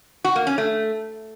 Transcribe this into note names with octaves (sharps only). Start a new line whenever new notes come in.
F#4
A#3
C#4
A3